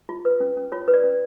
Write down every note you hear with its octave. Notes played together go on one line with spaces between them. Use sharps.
F4
B4
C#4
C#4
F4 C#5
B4
D5
C#4